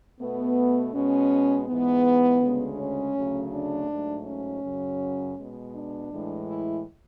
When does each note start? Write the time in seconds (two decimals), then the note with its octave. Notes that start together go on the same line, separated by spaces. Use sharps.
0.20 B2 A3 B3
0.93 B2 G#3 C#4
1.67 G#2 E3 G#3 B3
2.41 D2 C#3 G#3
2.78 C#4
3.15 D2 C#3 F#3 A3
3.52 D4
3.88 G#2 F#3 A3
4.26 C#4
4.62 F#2 C#3 F#3
5.36 B2 G#3
5.73 D4
6.10 A2 E3 G#3
6.47 E4